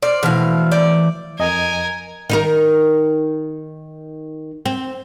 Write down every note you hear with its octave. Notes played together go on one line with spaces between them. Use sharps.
C5 D5 F6
B2 E3 A3 E4 F5
D5 G6
F2 A#4 D#5 G#5
D#3 D#4 A#4
C4